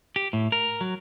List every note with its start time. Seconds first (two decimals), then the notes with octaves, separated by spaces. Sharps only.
0.16 G4
0.33 A2
0.52 A#4
0.81 F#3